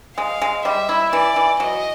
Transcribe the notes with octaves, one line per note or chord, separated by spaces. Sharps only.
G#3 F5
G#3
G3 E5
E4
E3 D5
E3
F#3 D#5